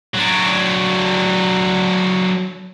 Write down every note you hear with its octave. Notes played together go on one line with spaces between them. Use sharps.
F#3 D4